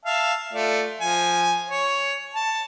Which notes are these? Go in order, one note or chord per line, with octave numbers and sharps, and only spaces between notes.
E5 F5 A5
A3 F4 D5
F3 G#5
C#5
A5